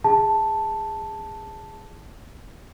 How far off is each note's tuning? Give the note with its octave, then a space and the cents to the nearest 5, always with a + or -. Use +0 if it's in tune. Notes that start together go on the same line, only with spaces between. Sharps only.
G#4 -25 A5 +0